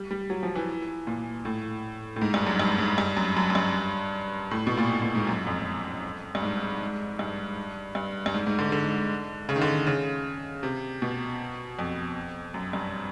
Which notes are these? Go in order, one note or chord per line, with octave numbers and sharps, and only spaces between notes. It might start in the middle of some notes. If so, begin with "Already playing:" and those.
Already playing: G3
G3
F#3
F3
E3
A#2
A2
A2
G#2
G2
F#2
G2
G#2
G2
F#2
F#2
F#2
G2
A2
B2
A#2
A2
A#2
G#2
F#2
F2
G2
G#2
G2
G2
G2
G#2
G#2
D3
D3
C#3
D#3
D3
C#3
C3
B2
F2
F#2
G2